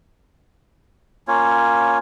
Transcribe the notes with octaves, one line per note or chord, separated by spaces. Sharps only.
A#3 C#4 F4 C#5